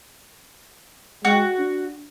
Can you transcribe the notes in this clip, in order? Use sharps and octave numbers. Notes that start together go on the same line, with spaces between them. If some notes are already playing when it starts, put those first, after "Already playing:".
G#3 F#4
D4